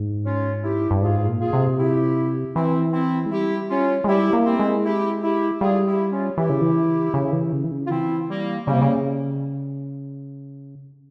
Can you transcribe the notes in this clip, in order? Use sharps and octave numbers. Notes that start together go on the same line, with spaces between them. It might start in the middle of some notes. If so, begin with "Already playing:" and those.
Already playing: G#2
C#4 F4
E4 G4
G2
G#2 F4 G#4
A#2
F4 G#4
C3
E4 G4
E3 C4 E4
C4 E4
G#3
G3 E4 G4
C#4 F4
G#3
G3 E4 G4
A#3
C4 E4
G#3
E4 G4
E4 G4
G3 F4 G#4
E4 G4
C#4 F4
E3 E4 G4
C#3
E3
C#3
E3
C#3
E3
C#3
F4
E3 C4 E4
G3 A#3
C#3 G3 A#3
C3
C#3